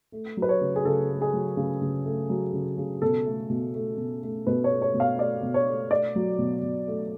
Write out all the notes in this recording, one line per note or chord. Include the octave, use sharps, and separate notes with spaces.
A3
F#3
B4
C#5
C#3
G#4
C#3 A4
A3
G#4
F#3
C#3
C#3
A3
F#3
C#3
C#3
B2 A4
A3
B2
A3
B2
A3
B2 B4
C#5
A3
C#5
B2
F5
A3 D5
B2
C#5
A3
A3 D5
F#3
B2
B2
A3